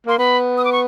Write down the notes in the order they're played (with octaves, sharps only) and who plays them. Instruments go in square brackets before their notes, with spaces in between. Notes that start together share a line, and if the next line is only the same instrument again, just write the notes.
[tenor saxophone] A#3 [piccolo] C6
[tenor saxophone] B3 [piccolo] B5
[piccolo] D#6
D6
C#6